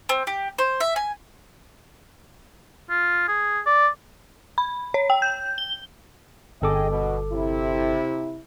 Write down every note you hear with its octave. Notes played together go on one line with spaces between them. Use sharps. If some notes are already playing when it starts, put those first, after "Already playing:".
C4
G4
C5
E5
G#5
F4
G#4
D5
B5
C#5
G5
G6
G7
G1 G#4 A4 D#5 G5 D6
B2
C3 E4